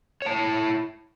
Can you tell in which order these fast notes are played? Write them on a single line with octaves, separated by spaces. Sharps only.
C#5 A5 E4